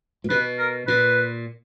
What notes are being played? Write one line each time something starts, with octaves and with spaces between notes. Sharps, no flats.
A#2
B2 B4
A#4
A#2 B4